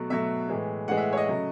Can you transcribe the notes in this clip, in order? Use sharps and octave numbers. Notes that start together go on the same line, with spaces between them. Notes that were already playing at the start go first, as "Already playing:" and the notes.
Already playing: B2 F#3 A3
B2 F#3 A3 E5
A2 E3 G#3
A2 E3 G#3 F#5
E5
C#5
D#5
C#3 F#3 A3